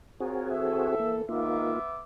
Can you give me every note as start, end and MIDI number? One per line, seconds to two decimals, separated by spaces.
0.20 0.95 60
0.20 0.45 65
0.20 0.95 66
0.20 0.95 68
0.20 0.45 70
0.20 0.45 73
0.50 1.25 52
0.50 1.25 69
0.50 1.15 76
1.00 1.22 58
1.29 1.76 44
1.29 1.76 51
1.29 1.79 58
1.29 2.03 59
1.29 1.76 63
1.29 1.79 65
1.29 2.03 76
1.29 2.03 86